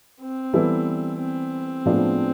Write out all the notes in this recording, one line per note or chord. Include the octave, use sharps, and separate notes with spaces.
C4
E3 G3 B3 E4 A4
C4
A2 F3 G#3 B3 D4